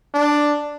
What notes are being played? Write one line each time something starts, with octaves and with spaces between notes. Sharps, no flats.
D4